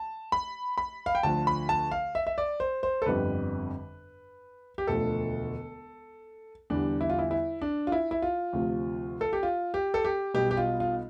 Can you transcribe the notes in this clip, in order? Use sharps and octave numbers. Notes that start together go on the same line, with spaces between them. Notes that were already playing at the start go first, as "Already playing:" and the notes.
Already playing: A5
B5
B5
F5
G5
D2 D3 F3 A5
B5
A5
F5
E5
E5
D5
C5
C5
A4
G1 F2 D3 G3 B4
G4
E1 D2 D3 F3 A4
E2 D3 G3 D4
E4
F4
E4
E4
D4
F4
E4
E4
F4
D2 C3 F3
A4
G4
F4
G4
A4
G4
B1 B2 G3 G4
G4
F4
F4